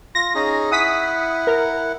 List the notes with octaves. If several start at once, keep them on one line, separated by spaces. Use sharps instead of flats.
F4 A#6
C#4 D#4 G#4
E4 F#5 D#6 B6
A#4